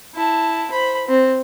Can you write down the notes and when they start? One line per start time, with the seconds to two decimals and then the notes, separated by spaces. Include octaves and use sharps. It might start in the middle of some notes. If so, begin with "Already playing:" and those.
0.15 E4 A5
0.71 C5 B5
1.07 C4